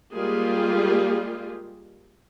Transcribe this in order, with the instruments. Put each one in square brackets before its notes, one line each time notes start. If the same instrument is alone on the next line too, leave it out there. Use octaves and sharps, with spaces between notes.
[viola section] G3 G#3 A#3 F4 G4 G#4